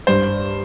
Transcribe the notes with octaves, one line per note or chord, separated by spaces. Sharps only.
G2 C5